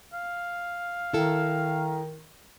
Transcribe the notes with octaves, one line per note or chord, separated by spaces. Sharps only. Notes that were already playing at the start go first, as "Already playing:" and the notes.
F5
D#3 E4 A4